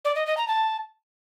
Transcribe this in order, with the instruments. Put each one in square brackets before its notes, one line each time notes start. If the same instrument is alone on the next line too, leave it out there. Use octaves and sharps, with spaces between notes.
[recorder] D5
D#5
D#5
A#5
A5